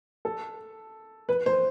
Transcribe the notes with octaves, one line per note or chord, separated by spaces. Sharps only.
A4
B4
C5